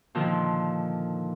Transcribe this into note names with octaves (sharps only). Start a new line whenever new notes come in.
A#2 D3 D#3 F3 F4